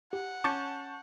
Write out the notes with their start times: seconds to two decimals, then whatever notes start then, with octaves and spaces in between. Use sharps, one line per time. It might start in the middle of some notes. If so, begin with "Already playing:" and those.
0.13 G4 F#5
0.44 C#4 A5 C#6 D6 G6 A6 C#7